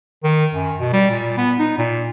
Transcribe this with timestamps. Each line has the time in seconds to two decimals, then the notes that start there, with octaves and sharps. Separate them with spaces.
0.23 D#3
0.54 F#2
0.80 B2
0.93 G3
1.10 A#2
1.37 B3
1.59 D#4
1.78 A#2